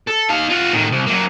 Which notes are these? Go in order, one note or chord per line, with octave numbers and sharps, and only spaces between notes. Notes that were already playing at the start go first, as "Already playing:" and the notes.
A4
D#4 F5
F4 F#4
A2 D#3
C2
F#3 A#3